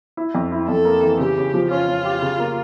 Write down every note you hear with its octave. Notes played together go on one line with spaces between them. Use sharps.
E4
F2
E4
F2 A4
A#3
E3
C#3 G4
C#3
F3
C#4 F4
C#4
G4
C#3
A#3